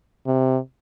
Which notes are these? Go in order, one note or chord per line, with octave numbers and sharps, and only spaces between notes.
C3